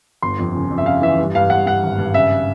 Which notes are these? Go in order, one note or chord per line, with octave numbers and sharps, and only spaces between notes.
G1 C6
F2
C#3
F2
E5
C#3 F5
E3 E5
G2
G2 F5
G2 F#5
G2 F#5
G#1
G2
C#3 E5